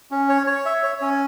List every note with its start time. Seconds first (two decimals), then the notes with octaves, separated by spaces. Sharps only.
0.11 C#4
0.29 C#5
0.47 C#5
0.66 E5
0.83 C#5
1.01 C#4